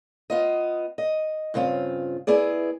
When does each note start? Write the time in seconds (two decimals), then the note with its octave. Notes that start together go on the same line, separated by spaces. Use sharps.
0.30 B3 F4 D#5
0.98 D#5
1.54 G2 C#3 C4 F4
2.27 B3 E4 G#4 D5